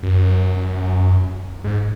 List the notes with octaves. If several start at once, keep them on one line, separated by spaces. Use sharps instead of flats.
F#2
G#2